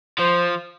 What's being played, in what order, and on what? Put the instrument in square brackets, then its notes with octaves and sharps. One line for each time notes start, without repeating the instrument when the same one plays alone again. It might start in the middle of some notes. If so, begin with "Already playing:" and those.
[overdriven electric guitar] F3 [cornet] C5